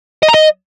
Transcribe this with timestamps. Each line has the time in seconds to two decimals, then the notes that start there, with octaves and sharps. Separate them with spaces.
0.23 D#5
0.28 A#5
0.34 D#5